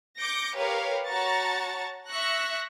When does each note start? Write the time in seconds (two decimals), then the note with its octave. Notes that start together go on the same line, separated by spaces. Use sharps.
0.19 D6 G6 A#6 C#7 D7
0.56 G4 A#4 B4 C#5 F5
1.06 F#4 C#5 A5 A#5 C#6 A6
2.09 E5 C#6 E6 F#6 A#6